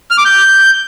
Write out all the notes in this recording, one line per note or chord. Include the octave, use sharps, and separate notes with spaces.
F6
D6
G6